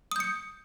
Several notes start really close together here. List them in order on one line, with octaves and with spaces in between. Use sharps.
D#6 G6 C#7